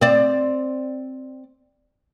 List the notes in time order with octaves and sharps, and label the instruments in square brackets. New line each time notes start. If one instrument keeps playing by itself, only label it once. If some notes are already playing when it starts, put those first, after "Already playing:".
[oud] C4 D5